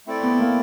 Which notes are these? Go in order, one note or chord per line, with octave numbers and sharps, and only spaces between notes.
A3 C4 E4 A4 D5
B3
A#3